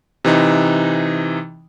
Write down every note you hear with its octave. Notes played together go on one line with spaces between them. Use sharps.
C3 E3 D#4